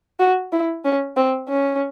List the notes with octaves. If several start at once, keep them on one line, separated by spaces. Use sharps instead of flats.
F#4
E4
C#4
C4
C#4